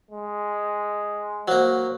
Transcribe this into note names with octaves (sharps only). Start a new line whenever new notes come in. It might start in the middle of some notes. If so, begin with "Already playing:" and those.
G#3
F#3 A#3 C5